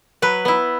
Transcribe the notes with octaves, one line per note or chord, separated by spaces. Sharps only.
F#3 B4
B3 E4